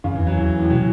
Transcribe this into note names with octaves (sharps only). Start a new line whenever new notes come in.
F#2 C#3
E2 E3
F#3
E2 E3
A2
B2 F#3